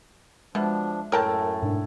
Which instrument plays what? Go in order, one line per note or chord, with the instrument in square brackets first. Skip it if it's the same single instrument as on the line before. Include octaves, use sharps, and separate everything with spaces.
[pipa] B2 [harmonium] F3 D4 [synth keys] G#3 E5
[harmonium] F#2 [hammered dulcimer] A2 [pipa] A#4 G5 A5
[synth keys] G#2 B2 D4